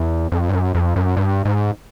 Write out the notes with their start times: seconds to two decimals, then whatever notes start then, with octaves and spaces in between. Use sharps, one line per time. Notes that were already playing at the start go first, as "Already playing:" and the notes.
Already playing: E2
0.32 F2
0.49 G2
0.53 F#2
0.75 F2
0.96 F#2
1.17 G2
1.45 G#2